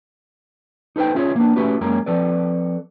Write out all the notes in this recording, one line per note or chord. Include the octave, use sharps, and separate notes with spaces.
D#4 A4 B4 C5 G5
C#4 E4 F4 G#4 C5 C#5
A#3 B3 D4
A3 C#4 E4 F#4 G4 B4
F#2 G#3 A#3 C#4 A#4
F3 C4 A4 B4 D5